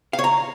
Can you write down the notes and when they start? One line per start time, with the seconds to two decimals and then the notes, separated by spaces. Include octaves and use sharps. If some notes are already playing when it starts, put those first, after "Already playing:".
0.13 F5
0.19 C#5
0.24 A#5